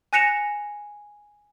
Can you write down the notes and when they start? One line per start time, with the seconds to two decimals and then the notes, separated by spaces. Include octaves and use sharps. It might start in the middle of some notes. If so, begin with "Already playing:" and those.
0.13 G#5 F#6 A#6 C#7 E7 F7